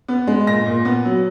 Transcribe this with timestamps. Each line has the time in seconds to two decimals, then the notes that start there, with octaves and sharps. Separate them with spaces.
0.08 B3
0.27 G#3
0.47 A#2 A#6
0.66 A#2
0.85 B3
1.05 F#3